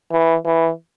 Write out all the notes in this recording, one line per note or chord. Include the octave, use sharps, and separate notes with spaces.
E3
E3